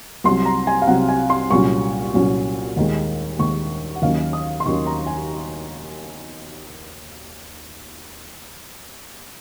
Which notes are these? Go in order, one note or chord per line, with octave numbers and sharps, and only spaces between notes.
C2 C3 F#3 C6
A#5
G#5
F5
C2 C3 F#3 F#5
G#5
C6
C2 A#2 F#3 C#4 C#6
C2 A#2 F#3 C#4
D#2 D#3 G#3
D#2 D#3 G#3 C#6
F#5
D#2 D#3 F#3 A#3 C#4 F5
D#6
C6
D#2 D#3 F#3 A#3 C#4 C#6
A#5
G#5